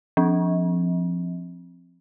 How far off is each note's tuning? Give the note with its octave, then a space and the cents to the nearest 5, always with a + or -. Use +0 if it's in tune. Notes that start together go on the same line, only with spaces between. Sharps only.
F3 +0 C4 +0